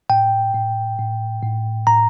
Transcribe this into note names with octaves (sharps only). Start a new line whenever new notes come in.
A2 G5
A2
A2
A2
A2 A#5